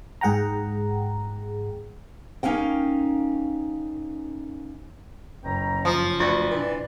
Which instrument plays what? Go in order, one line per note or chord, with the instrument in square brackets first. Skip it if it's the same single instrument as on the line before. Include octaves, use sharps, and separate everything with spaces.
[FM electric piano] G#2 G#4 F#5 G5 A#5
[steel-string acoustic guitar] A#3 C#4 D#4 F5 G5
[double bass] F#1 C#4 [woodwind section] B2 G5 A#5
[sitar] F3
[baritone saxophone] D2 [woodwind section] C4 B4 D5
[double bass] B2 D4 [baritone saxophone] E3